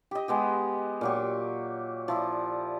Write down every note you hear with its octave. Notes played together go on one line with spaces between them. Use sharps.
G4 D#5
G#3 B3 G4
A#2 F#3 G4
F3 E4 D5